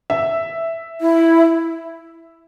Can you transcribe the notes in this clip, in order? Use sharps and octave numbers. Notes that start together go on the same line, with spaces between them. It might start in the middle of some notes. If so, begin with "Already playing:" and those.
E5
E4